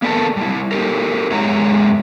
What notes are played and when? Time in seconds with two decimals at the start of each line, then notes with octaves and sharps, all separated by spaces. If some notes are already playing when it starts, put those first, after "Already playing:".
0.02 A#3 B3 D4 A4 A#4 A5
0.37 G3 E4
0.72 D#4 G4 A4 A#4
1.31 F#2 G#3 C#5 E5 F#5 A#5